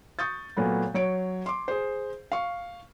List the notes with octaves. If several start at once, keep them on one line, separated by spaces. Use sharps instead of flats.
C#6 D#6 G6 A6
A#2 F#3 A3 B3
F#3 C#5 D7
C6 D6
G#4 C5
F5 C#6